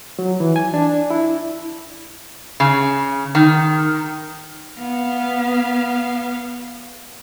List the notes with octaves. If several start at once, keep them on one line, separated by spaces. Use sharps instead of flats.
F#3
E3
G#5
D4
E4
C#3
D#3
B3 F5